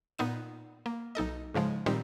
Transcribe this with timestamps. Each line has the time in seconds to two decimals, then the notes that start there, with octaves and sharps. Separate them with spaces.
0.19 A#2 B3 D#4 D#7
0.86 A#3
1.15 B1 D#4 A4 D#5
1.54 G#2 C#3 F3 G#3
1.86 A#2 D#3 G3 C4 D#4 G4